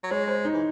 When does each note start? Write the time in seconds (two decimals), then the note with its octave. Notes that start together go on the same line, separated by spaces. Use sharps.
0.03 F#3
0.11 G#3 C#5
0.28 C5
0.45 D#4
0.54 E3